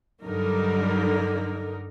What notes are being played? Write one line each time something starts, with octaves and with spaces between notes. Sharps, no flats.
G2 D3 F#3 G3 D#4 A#4